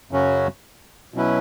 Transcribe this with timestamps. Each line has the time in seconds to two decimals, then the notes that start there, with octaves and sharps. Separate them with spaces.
0.11 F#2 C#3 F#3 C#4 F#4
1.14 B2 F#3 C#4 E4 B4